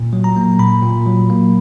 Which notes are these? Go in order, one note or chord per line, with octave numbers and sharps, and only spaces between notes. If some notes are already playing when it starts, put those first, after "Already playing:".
Already playing: A#2
F#3
A#5
A#3
A#2 B5
A#2
F#3
A#3